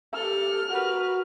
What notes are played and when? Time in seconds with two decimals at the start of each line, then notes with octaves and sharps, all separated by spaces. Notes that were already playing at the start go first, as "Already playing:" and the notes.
0.14 G4 A4 F6
0.69 F#4 G4 A#4 B4